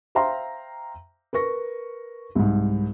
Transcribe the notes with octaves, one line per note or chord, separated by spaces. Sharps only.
C5 E5 F5 G5 A#5 C6
A#4 B4 C#6 A#6
C2 G#2